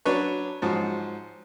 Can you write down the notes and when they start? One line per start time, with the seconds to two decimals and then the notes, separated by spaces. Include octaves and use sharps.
0.05 F#3 D4 B4 C#5
0.62 G#2 F3 F#3